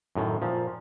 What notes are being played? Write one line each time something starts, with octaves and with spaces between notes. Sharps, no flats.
F#2 A2 D#3
A#2 F3